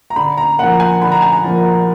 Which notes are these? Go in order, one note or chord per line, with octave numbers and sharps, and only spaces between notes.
A#5
D3 B5
A#5
F3 A#3 F#5
G#5
D3 B5
A#5
G#5
A#5
F3 A#3